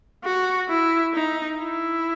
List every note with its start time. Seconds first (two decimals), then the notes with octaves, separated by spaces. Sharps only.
0.24 F#4
0.69 E4
1.14 D#4
1.58 E4